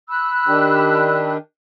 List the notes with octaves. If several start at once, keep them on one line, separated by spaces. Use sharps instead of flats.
B5 E6 F#6
D#3 D4 G4